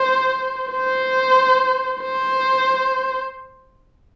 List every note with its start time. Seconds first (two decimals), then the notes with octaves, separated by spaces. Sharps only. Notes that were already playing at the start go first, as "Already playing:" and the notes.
Already playing: C5
0.71 C5
2.02 C5